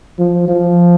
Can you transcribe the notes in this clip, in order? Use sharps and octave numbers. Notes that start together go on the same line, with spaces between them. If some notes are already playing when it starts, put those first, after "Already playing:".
F3
F3